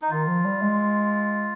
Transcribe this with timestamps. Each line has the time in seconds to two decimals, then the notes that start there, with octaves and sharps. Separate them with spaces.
0.02 D#4
0.10 D#3 F4
0.27 F3
0.44 G3
0.62 G#3